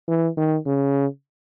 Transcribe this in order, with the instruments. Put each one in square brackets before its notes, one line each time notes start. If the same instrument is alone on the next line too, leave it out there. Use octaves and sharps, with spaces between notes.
[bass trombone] E3
D#3
C#3